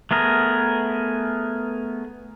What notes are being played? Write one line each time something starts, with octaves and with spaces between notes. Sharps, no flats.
A3 B3 G#4 A#4